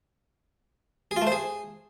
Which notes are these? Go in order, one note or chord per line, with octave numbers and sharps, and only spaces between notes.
G#4
F4
A3
C5
G#4